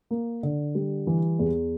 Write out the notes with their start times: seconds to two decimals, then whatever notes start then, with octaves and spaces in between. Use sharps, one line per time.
0.11 A#3
0.43 D3
0.75 G3
1.07 E3
1.39 E2